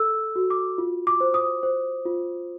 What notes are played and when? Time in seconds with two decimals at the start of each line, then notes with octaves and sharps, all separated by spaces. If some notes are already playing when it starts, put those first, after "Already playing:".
Already playing: A4 E6
0.36 F#4
0.50 D6
0.78 F4
1.07 D6
1.20 C5
1.34 D#6
1.63 C5
2.05 F4